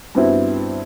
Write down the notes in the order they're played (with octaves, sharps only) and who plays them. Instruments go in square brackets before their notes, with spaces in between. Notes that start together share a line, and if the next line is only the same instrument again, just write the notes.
[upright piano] G2 B3 C4 E4 F#4